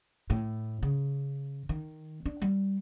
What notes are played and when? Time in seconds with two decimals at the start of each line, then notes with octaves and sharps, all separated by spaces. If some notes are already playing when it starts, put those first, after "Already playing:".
0.30 A2
0.83 C#3
1.69 D#3
2.26 D4
2.42 G3